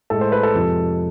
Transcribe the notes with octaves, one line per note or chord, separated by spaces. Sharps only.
A2 G#3 A4
C5
B4
A4
F2 C3 F3 G#3